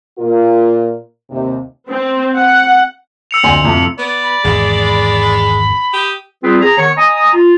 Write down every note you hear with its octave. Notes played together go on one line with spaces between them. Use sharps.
A#2 F4 A#4
D#2 C3
C4
F#5
E6 C#7 F7
D2 G#5 C6
F2 A2 C3
B3 D5
B5
G#1 E2 G#2 G#3 B5
G4 D#6
G3 C4 F4 G#4 B4
G#4 A#5
D#3 B3 C#5
D#5 G#5 A#5 D#6
F4